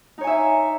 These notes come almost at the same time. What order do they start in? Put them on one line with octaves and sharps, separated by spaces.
D#4 C#5 G#5 E5